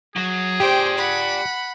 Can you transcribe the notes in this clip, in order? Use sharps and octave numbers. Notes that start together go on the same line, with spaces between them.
F#3 F#4 G#4
G4 C5 D5 G5 G#5
F#5 B5